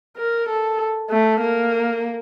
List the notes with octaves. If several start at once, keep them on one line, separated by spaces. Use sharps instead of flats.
A#4
A4
A3
A#3